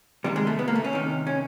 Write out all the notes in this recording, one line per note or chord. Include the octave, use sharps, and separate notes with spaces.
C3 D#3 G3
G#3
A3
B3
A#3
A3
C#4
C3 D#3
C#4